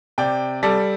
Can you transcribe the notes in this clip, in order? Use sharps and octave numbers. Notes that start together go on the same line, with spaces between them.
C3 D5 G5
G3 A4 D5